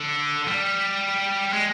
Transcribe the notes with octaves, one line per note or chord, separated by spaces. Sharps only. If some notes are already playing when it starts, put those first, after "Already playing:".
Already playing: D3
G3
G#3